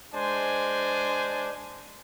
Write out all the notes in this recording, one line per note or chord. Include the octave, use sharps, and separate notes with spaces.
G#3 D4 C5 G#5